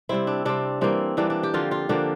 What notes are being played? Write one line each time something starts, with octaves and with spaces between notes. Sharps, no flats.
C3 G3 C4 E4
D4
C3 G3 C4 D4
E3 G3 A#3 C4
E3 G3 A#3 D4
D4
G4
D3 F3 A#3 F4
F4
D3 F3 A#3 D4